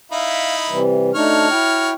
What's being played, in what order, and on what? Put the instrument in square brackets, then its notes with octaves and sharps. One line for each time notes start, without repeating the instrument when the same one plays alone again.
[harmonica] D#4 E4 B5 [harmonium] E5 F5
[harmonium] C3 E3 G3
[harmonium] A3 D4 D#4 [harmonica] F#4 C#5 F6
[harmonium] E4 G5